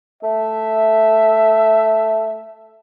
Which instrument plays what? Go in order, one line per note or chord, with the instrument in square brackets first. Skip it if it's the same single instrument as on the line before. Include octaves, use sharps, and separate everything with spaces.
[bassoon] A3 [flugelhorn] E5